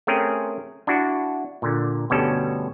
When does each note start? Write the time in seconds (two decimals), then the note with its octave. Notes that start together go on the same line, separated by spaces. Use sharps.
0.07 A3 C4 C#4 G#4 A#4 G5
0.87 D4 E4 F#4
1.62 A#2 D3
2.10 G1 D2 B2 G3 C#4 A4